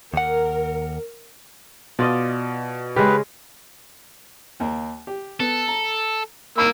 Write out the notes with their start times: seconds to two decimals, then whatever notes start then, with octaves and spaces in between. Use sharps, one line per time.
0.14 D#2 A#4 F#5
1.99 B2 F4 D5 D#5
2.96 C#3 G#3 G4 B4
4.60 D#2 A#3
5.07 G4
5.40 B3 A4
5.68 A#5
6.58 C2 A#3 B5 E6